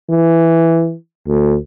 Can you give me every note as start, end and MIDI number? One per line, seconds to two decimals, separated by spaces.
0.10 0.95 52
1.27 1.57 38